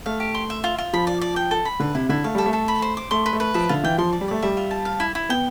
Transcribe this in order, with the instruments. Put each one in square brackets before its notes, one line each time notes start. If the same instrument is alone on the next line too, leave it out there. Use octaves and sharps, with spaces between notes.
[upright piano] A3 [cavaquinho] F5
[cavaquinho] G4
C6
E5
F4
F4
[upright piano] F3 [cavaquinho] B5
[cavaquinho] D5
D5
G5
A4
B5
[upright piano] D3 [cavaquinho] B4
[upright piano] C3 [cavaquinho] E4
[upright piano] D3 [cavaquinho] E4
[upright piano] A3 [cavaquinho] F5
[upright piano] G3 [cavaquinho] A4
[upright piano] A3
[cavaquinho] A4
B5
C5
D6
[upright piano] A3 [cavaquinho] C6
[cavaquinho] B4
[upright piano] A3
[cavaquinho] B4
[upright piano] F3 [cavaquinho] E5
[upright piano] D3 [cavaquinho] F4
[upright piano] E3 [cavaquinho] G5
[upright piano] F3 [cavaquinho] C6
[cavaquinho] D5
[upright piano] G3
[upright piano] A3 [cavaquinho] D5
[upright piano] G3 [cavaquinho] E5
[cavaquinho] F4
A5
F5
E4
E4
[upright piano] B3 [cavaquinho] G5